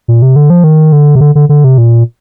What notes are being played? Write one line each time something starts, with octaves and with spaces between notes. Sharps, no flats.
A#2
C3
D3
F3
D#3
D3
C3
D3
D3
D3
C3
A#2